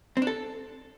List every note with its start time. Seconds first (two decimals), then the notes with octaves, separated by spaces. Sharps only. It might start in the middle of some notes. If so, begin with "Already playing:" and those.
0.17 C4
0.22 D4
0.27 A4